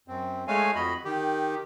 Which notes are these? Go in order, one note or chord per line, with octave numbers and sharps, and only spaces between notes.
F#2 C4
G#3 A3 C#5 F5 G#5
F2 F#4 D#5 B5
D#3 G4